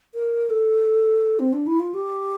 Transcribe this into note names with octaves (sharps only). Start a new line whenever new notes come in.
A#4
A4
C4
D4
E4
F4
G4